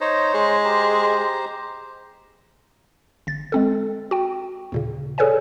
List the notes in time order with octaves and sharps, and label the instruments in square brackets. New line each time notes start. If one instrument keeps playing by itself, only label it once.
[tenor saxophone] D#4 [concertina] C5 C#5 A#5
[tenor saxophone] G#3
[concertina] G4 C5 A#5
[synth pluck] G1 A6
G#3 C4 A4
F#4 G5
D#2 A#2 C#3
G#4 A4 B4 C#5 D5 G#5